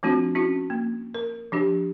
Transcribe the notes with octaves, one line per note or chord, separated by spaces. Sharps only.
F3 A3 C4 D4 F4 F#4
C#4 E4 F#4
A#3
A#4
F3 D4 G4